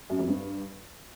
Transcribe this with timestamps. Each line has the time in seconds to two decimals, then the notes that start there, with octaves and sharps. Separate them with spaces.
0.10 F#2
0.19 F2
0.28 G2